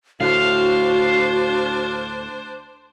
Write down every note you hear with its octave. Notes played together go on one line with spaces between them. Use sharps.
D2 A2 D4 F#4 C5 F5